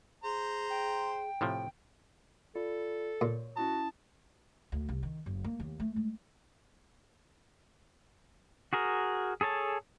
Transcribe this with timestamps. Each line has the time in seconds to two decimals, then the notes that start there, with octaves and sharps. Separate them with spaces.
0.24 G#4 C5 A#5
0.70 G5
1.41 A2 C3 F3
2.55 F4 A4 D5 B5
3.21 A#2 C#5
3.56 C#4 E4 F#4 A5 D#6
4.72 D2
4.89 C2
5.03 D#3
5.26 F#1
5.44 A#3
5.60 D#2
5.80 A3
5.96 G#3
8.73 F#4 G#4 A#4
9.41 G#4 A4 C#5 A5